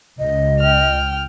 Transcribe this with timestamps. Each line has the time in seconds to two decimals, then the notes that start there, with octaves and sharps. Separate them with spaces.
0.19 C#2 D#5
0.61 G5 F6